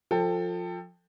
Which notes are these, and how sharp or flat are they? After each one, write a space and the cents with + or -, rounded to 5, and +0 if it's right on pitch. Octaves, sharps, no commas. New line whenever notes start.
F3 +15 A4 +20 G5 +20